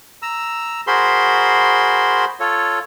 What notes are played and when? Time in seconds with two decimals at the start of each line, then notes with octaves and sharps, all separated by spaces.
0.22 A#5 E6
0.87 F#4 G#4 A#4 C5 B5 C6
2.40 F4 A4 C#5